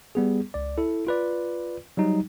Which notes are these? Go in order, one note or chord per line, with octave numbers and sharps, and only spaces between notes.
G3 B3 G#4
C#2 D5
E4 A4
F4 B4 D5
F#3 G3 D#4